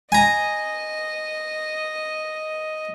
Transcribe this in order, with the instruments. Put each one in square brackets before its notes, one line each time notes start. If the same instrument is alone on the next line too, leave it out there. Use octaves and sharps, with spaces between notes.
[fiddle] D#5 [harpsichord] G#5 A#5